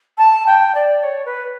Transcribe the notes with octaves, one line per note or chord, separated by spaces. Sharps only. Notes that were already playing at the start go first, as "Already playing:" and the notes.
A5
G5
D5
C#5
B4